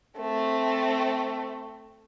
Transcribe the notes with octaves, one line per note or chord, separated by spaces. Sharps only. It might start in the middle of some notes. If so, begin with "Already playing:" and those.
A3 C4